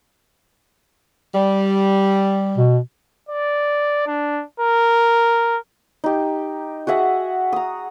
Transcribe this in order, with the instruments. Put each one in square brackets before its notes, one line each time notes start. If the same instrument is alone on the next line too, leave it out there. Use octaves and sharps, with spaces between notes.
[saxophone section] G3
[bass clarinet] B2
[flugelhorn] D5
D4
A#4
[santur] D#4 G4
F#4 G#4 E5 F#5
A#5 D#6